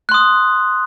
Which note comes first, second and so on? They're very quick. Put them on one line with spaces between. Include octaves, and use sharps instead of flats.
F#6 C6 D#6